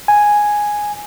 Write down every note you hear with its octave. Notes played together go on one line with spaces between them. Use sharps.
G#5